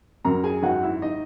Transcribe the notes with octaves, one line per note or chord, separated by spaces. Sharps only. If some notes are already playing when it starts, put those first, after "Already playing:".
F#2 A#4 A#5
G#4 G#5
G#1 F#4 F#5
E4 E5
D#4 D#5